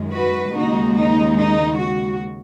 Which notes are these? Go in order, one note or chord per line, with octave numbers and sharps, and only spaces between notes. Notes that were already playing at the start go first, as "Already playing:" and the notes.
Already playing: F#2 D#3 G#3
F#4 B4
D#2 C#3 G#3 D#4 F#4
D#4
D#4
F#4